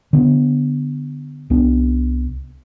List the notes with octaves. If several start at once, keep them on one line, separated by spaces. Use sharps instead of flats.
D3 B3
C2 B3 D4